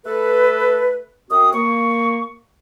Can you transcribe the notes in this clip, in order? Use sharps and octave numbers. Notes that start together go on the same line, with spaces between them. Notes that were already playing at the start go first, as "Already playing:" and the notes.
A3 A4 B4
F#2 C4 F#4 D#6
A#3 C#6